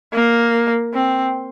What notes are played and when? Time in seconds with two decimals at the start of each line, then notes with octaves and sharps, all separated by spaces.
0.13 A#3
0.94 C4